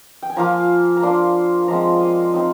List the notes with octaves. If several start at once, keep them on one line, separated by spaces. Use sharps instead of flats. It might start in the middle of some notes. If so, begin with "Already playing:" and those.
G5
G#5
F3 A#3 F4 A#5
A#5
A#3 D4 F4 C6
F3 G#3 C4 A#5
D#5 F5
C4 D#4